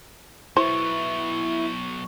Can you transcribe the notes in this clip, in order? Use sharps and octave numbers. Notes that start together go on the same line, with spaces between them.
F#3 B3 E4 C5 C#6